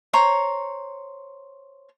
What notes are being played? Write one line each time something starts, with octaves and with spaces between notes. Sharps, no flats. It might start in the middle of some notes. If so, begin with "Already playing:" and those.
C5 C#5 A#5